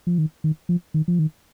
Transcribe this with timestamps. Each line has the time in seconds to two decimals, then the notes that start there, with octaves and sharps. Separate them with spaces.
0.07 F3
0.18 D#3
0.44 D#3
0.69 F3
0.94 D#3
1.08 F3
1.19 D#3